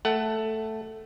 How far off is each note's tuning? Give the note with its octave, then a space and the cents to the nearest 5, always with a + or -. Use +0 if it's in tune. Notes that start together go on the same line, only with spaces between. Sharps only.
A3 +0 F#5 +20